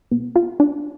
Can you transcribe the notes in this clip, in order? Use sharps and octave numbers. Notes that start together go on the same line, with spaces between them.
B2
F4
D4